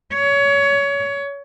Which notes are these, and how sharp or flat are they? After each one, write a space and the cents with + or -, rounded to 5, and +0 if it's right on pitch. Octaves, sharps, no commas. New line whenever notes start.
C#5 +25